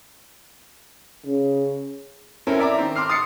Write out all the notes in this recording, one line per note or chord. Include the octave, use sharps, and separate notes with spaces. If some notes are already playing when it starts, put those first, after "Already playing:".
C#3
A3 C4 C#4 E4 A#4
D5 E5 A#5 D6
D#3 C4
C6 D6 F6 C7
D#6 A6 C7 C#7